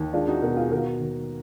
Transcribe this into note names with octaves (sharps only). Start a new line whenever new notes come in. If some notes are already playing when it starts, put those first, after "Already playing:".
Already playing: D#2 D#3
G#3 D4 F4
D#4 F#4
B2 F#4 A#4
F4 G#4
D#3 F#4 A#4
D#2